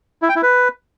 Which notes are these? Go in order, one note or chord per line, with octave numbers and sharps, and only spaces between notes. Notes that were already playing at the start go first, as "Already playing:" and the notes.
E4
G5
E4
B4